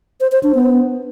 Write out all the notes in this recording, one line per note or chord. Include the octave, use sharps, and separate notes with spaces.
C5
C5
D4
B3